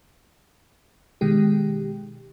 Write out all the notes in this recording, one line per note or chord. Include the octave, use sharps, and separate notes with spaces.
B2 D#3 G#3 G4